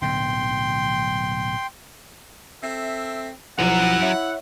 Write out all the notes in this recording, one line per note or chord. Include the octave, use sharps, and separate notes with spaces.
D1 B1 D3 G5 C6
C4 A4 E5
B1 F#2 F3 F#3 E4 F#5
C#5 E5